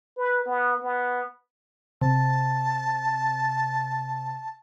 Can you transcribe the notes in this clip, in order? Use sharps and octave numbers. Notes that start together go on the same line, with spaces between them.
B4
B3
B3
C3 A5